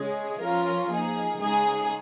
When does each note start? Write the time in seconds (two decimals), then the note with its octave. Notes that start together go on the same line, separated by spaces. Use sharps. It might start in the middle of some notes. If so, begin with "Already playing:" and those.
Already playing: C#3 G#3 C#4 G#4
0.40 F3 C#4 F4 A#4
0.90 F3 A#3 D#4 G#4
1.41 C#3 G#3 D#4 G#4